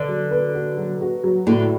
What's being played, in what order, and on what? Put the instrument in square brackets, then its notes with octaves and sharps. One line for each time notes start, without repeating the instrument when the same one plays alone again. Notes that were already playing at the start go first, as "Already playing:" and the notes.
Already playing: [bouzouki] D3 [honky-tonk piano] B4
[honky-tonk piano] F#3
B4
F#4
F#3
F#4
F#3
[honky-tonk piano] A2 [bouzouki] D3